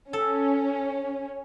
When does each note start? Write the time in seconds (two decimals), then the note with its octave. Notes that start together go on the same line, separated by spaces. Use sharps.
0.13 C#4 A4